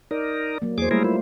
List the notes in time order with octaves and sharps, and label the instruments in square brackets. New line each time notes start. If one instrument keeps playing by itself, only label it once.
[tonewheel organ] D#4 A#4 [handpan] D5
[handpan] F#3 A#3
[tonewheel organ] E2 G#4 D6 [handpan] A#3 C5
[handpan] G3 A3 A#3 [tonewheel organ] E4 G#4 A#4
[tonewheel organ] E4 [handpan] F4